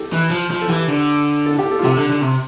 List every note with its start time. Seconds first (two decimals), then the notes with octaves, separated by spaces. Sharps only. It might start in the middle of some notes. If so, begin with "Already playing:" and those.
Already playing: G4 A4
0.12 E3
0.31 F3
0.51 F3
0.61 A4
0.69 E3 G4
0.88 D3
1.46 A4
1.59 G4
1.71 A4
1.79 F4
1.84 C3 G4
1.97 D3
2.09 D3
2.21 C3